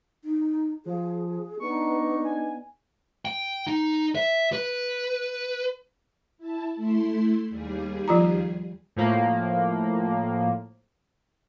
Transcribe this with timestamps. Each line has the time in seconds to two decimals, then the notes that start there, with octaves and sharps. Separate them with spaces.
0.24 D#4
0.86 F3 G#4
1.60 B3 D4 D#4 C#6
2.25 G#5
3.25 G5
3.67 D#4
4.15 E5
4.53 B4
6.38 E4 A5
6.75 A3 E4 C6
7.50 D#2 G3 G#4
8.08 F3 F4 A#5
8.96 A2 F3 A#3